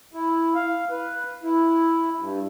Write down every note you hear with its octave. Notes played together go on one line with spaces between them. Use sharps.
E4
F5
B4
E4
G2